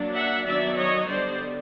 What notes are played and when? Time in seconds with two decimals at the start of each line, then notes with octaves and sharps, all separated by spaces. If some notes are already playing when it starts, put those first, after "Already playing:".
Already playing: F#3 A#3 D4
0.13 E5 F#5
0.44 D#3 F#3 B3 D4 D5 E5
0.77 C#5 D#5
1.07 D3 G3 B3 D4 C5 D5